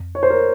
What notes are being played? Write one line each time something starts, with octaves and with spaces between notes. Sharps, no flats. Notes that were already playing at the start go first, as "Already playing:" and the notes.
Already playing: F2
C#5
C5
A#4